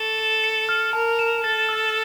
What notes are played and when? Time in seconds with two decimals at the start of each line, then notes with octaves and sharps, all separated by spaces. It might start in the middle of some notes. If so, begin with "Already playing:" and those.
Already playing: A4 C#6
0.18 E7
0.44 C#7
0.69 F6
0.93 A#4 A5
1.19 E7
1.44 A4 A6
1.69 E6